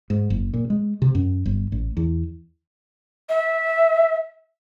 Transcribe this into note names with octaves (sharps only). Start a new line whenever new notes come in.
G#2
F#1
A#2
G#3
C3
F#2
G1
A1
E2
E5